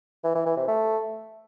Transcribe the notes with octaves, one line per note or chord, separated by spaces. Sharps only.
E3
E3
E3
C3
A3